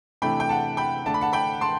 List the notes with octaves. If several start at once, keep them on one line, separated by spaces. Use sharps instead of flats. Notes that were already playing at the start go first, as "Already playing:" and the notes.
C3 E3 A3 D4 G5 B5
G5
F#5 A5
G5 B5
D3 A3 D4 A5
B5
F#5 A5
G5 B5
A5 C6